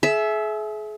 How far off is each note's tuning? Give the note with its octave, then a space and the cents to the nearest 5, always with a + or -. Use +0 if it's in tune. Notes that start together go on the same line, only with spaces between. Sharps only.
G#4 +40 E5 +0